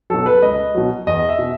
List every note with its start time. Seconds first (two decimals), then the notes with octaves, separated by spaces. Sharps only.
0.10 B2 F#3 A4
0.26 B4
0.42 C#2 D#5
0.75 B2 F#3
1.07 E2 D#5
1.29 E5
1.39 B2